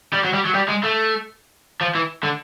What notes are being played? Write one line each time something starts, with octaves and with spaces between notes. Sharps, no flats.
G3
F#3
G3
F#3
G3
G#3
A3
F3
E3
D3